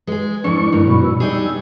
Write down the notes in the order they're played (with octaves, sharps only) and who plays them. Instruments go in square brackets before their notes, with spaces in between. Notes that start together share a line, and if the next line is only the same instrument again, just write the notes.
[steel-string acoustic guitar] G#3 G#4 [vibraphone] B4
[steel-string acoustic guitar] F2 G#2 [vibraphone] G#3 E4 [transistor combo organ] D4 C#6
[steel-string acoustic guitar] G2 [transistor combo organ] D#3 A#3
[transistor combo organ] F#2 B2 [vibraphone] B5 C#6
[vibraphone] E6
[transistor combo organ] G3 [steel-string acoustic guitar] D4 D#4 G#4